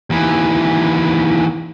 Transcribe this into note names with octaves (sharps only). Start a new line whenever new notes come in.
D#2 E3